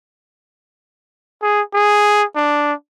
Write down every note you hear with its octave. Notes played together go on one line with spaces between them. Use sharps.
G#4
G#4
D4